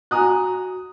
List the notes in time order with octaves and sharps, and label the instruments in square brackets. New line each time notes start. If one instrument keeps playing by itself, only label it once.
[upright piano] F#4 G#5 A#5 D#6 F#6